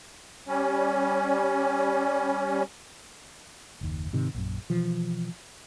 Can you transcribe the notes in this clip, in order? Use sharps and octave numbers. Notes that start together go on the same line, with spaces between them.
G3 C#4
F#1 D#2
G#2 C3 D#3
A#1 F#2
B2 E3 F3